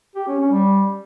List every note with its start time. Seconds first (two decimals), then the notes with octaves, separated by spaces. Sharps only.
0.16 G4
0.28 C#4
0.40 C#4
0.52 G3